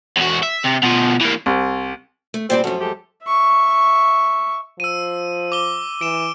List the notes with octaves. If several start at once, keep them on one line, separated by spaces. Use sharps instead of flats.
E2 F#4
E5
C3
B2 F3
E3 A#3
C2
A3
A#2 G3 C4 D5
F#2 F3 C#4 F#4 A4
G#3 G4 A4
E5 C#6
F3 E6 D#7
D6 G7
E3 D7 E7